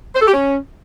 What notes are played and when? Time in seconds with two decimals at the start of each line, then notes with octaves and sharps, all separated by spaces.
0.15 C5
0.22 A4
0.28 G4
0.34 C#4